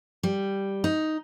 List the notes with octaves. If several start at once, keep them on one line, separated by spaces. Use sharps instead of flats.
G3
D#4